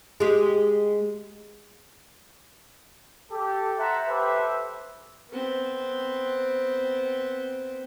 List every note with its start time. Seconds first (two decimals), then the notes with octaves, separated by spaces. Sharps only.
0.20 G#3 G4
3.31 G4 A4
3.78 C5 E5 F#5 A5 A#5
4.08 G4 A4 B4 C5 E5
5.31 B3 C4